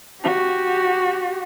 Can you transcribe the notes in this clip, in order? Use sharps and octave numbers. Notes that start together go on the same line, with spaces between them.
F#4 G4